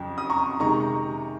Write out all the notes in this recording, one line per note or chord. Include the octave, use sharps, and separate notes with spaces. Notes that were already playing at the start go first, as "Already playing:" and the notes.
Already playing: F2 C#3 F#3
D#6
A#5 C#6
C3 D#3 G#3 A#5 C#6